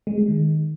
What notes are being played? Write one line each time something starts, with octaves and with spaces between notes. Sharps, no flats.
G#3
G#3
D#3